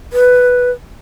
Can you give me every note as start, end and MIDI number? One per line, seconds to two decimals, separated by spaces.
0.13 0.71 71